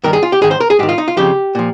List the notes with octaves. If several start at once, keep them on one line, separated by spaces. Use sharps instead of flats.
G2 D#3 A#4
G#4
F4
G4
G#2 D#3 G#4
C5
A#4
G#4
G#2 D#3 G4
F4
D#4
F4
F2 C#3 F3 G4
A#2 F3